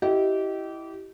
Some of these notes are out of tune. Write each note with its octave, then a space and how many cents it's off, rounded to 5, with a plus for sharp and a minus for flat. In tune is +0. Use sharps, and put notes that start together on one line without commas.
E4 +0 G4 -25 D#5 +0